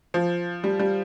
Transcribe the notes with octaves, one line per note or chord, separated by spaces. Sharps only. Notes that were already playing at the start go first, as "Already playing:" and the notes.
F3
G3
G3